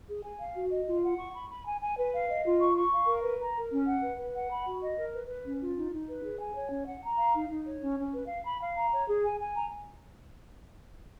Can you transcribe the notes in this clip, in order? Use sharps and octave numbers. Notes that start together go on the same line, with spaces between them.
G#4
G#5
F5
F#4
D#5
F4
F#5
C#6
B5
B5
G#5
G#5
B4
F5
D#5
F4
C#6
C#6
F5
A#4
B4
A#5
A#4
C#4
F#5
B4
B4
F#5
B5
F#4
D#5
A#4
B4
B4
C#4
F4
D#4
D#4
B4
G#4
G#5
C#5
C#4
F#5
A#5
F5
D#4
D#4
C#5
C#4
C#4
B4
F5
B5
F5
A#5
C#5
G#4
G#5
G#5
A#5